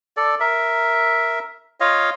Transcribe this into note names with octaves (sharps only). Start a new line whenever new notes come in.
A4 D5
A#4 E5
F4 C#5 D#5 F5